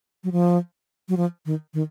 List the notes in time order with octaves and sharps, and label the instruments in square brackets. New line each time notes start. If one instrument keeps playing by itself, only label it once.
[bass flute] F#3
F3
F#3
F3
D#3
D#3